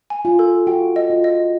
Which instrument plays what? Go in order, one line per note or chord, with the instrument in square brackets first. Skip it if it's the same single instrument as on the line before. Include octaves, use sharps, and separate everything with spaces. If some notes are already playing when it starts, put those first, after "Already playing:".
[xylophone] G#5
[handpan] F4
[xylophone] A4
[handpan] F#4 [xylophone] G5
[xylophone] D#5
[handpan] F4
[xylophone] D#5